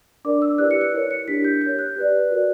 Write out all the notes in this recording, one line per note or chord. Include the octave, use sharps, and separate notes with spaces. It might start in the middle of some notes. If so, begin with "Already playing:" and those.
D4 A#4 D5 D6
E6
E4 G4 B4 D5 F#6
C#7
C#7
E4 A#4 C#5
C#7
D4 G4 A#4 B6
G6
G4 C#5 G6
F#6
G4 B4 D5
F#4 A#4 D5